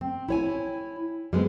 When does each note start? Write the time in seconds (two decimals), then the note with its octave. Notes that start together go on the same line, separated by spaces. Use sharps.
0.01 C4
0.29 E4 C#5 G#5
1.33 G3 G#3 B3 C4